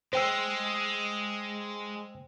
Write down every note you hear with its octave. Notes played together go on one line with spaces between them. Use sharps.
G#3 C5 G5 E6